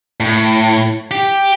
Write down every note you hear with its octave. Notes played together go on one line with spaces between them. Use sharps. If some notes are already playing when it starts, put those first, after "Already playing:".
A2
G4